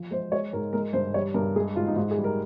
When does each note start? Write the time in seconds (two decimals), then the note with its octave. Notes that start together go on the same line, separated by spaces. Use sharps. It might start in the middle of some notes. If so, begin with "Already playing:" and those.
Already playing: F3
0.11 G#3 C5
0.32 G#3 C#5
0.53 G#2 A#4
0.73 G#3 A#4
0.93 G2 C5
1.14 G3 C#5
1.34 G2 A#4
1.56 G#3 G#4
1.76 G#2 F4
1.87 D#4
1.96 G#2 F4
2.11 G#4
2.18 G3
2.24 A#4